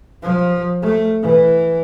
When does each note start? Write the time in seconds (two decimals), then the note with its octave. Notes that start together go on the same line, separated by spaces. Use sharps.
0.23 F3
0.83 A3
1.23 E3